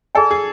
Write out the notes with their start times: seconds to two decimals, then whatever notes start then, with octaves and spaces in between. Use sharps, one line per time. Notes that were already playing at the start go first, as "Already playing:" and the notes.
0.15 G#4 A4 D5 G#5
0.31 G#4